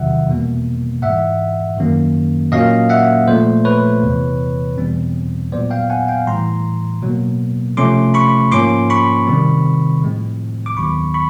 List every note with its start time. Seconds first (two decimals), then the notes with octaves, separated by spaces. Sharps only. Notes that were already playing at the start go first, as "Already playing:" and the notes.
Already playing: E2 C3 D#3 F#3 E5 F#5
0.27 E2 B2 G3 A#3
1.02 G#2 E3 G#3 E5 F#5
1.77 F#2 D#3 F#3 A#3 C#4
2.52 A#2 F#3 A#3 C#4 D#5 F5
2.90 E5 F#5
3.27 A#2 F3 A3 C5
3.65 B4 C#5
4.02 E2 C3 E3
4.78 E2 B2 G3 C4
5.52 A#2 F#3 B3 C5 D5
5.70 F5 G5
5.90 F#5 G#5
6.08 F5 G5
6.27 A2 E3 G3 A#5 C6
7.02 B2 F#3 A#3
7.77 C3 F3 A3 C#4 C6 D6
8.14 B5 C#6
8.52 G#2 F3 A#3 C#4 C6 D6
8.90 B5 C#6
9.27 C3 D#3 G3 C4
10.02 A2 F3 G#3 C4
10.66 D6
10.77 D#2 D#3 F#3 B3 B5 C#6
11.14 B5 C#6